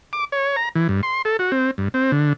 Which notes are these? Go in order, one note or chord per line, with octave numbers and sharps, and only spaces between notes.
D6
C#5
A#5
E3
G2
C6
A4
F#4
C4
G2
C4
D3